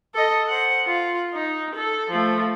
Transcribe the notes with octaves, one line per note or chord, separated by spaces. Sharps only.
A4 D#5
C5 F#5
F4
D#4
A4
F3 A3